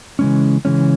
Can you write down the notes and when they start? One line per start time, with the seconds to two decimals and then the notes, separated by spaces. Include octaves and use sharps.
0.19 C#3 E3 G#3 C#4
0.65 C#3 E3 G#3 C#4